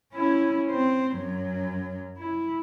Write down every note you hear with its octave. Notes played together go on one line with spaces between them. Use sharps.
C#4 E4
C4 C5
F#2 F#3
E4